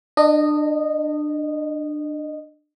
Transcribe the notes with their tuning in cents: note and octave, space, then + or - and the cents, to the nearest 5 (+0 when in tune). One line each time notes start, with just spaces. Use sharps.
D4 +25 D#5 -15